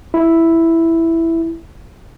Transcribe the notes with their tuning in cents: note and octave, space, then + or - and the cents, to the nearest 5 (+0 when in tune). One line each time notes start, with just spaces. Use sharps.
E4 +0